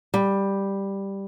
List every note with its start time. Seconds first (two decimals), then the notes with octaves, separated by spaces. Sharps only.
0.14 G3